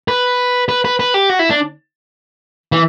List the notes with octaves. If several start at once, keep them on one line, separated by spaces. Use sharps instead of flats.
B4
B4
B4
B4
G4
F#4
E4
D4
E3